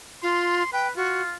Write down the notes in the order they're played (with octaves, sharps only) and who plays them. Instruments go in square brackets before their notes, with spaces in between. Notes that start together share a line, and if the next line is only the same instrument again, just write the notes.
[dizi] F4 [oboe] C6
[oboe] B4 [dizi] G5
[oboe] F4 [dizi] F#4